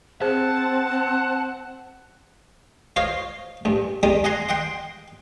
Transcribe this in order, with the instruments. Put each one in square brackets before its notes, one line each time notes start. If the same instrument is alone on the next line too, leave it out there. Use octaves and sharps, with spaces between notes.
[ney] C4 [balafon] G#4 C5 [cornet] F#5 [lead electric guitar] A5
[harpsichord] F4 C5 C#5 D#5 F5
A1 G2
E2 G3 G#3 D#4 D#6
D#5 F#5 G#5 A#5 C6
D#5 F#5 G5 C6